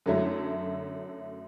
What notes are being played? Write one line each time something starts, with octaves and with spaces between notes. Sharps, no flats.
F#2 D3 F#3 A3 E4